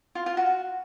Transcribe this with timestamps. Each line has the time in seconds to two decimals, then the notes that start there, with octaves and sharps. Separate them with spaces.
0.15 F4
0.26 F4
0.37 F#4